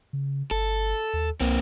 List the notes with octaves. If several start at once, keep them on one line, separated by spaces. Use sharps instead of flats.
C#3
G1 A4
D#2
C2 A#3 C4